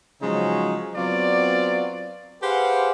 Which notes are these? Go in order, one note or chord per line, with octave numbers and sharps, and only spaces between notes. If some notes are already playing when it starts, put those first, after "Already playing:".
C#3 F3 F#3 G#3 C#4 D#4
F#3 B3 C4 F4 D5
G4 G#4 B4 C5 F5 F#5